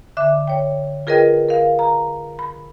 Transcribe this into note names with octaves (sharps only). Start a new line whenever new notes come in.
D3 E5 D6
C#5 G5
F4 G#4 A#4 B4 D#5 G5
A#4 F5
A#5
B5